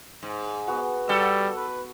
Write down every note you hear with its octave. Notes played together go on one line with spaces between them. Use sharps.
G#2
B3 F#4
G3 F#4 A4
B4